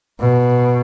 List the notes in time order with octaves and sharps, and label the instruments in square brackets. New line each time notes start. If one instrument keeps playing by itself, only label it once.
[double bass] B2